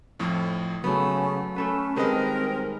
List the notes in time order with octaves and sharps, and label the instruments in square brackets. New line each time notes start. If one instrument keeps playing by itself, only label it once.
[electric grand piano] F2 A2 F3
[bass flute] C#3 [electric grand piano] F#3 [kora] A3 B3
[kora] A3 A4 B4 [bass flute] C#4
[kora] D#3 G#3 [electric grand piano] G3 B4 D#5 [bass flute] C4 [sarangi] A#4